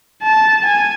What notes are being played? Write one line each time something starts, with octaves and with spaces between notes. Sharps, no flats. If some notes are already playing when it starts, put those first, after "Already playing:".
A5
G#5